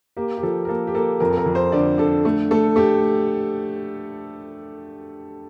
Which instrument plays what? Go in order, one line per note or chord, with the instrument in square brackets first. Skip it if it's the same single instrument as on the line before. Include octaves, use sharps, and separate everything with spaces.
[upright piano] A#3 G4
G4
F3 A4
A#4
A#3 A4
G4
A#3 A4
F2 A#4
A4
A#4
F2
C5
D3 D5
D3 A4
A3
A3 A4
A3 G4